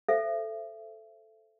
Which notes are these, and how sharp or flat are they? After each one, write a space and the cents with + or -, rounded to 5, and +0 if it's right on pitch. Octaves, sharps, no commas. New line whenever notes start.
A4 -5 C5 +0 E5 +30